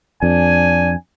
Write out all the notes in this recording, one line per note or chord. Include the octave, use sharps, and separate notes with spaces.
F2 D4 G#5